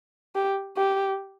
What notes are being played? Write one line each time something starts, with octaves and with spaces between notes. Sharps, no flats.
G4
G4